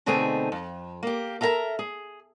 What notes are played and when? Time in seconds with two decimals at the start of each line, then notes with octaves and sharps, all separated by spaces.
0.06 B2 D3 A3 C4 D#4 G#4
0.52 F2
1.03 A#3 G4
1.41 A4 A#4 E5 F5 A#5
1.79 G#4